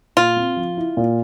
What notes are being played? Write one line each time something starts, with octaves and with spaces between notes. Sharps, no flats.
A#2 F4
C4
F3
E4
A#2